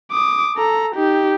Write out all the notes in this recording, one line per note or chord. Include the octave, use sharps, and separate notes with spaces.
D6 D#6
A4 A#5
D#4 G4